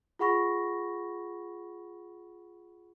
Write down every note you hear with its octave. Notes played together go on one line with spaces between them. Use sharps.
F4 G#4 F#5 B5 C#6 A#6